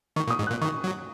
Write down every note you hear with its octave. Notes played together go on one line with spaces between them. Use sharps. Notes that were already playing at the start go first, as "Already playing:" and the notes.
D#3 C#6
A#2
D#6
G#2
A#2 F#6
D#3 C#6
F#3